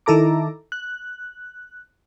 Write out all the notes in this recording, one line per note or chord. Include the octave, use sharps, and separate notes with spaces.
D#3 E4 A4 A#5 D6
F#6